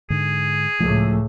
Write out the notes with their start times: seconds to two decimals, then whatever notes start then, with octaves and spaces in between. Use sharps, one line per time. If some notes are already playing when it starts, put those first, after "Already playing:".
0.10 G#2 D3 G#4
0.80 C#2 A2 F3 A3